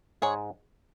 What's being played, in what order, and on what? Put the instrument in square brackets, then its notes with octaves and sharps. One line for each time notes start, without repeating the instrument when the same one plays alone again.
[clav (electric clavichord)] G#2 G#3 [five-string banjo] G#4 C#5